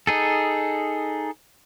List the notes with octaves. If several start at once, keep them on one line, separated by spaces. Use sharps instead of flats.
D#4 G#4 A4